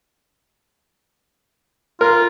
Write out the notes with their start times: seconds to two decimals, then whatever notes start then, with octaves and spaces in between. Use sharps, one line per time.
2.01 F4 A#4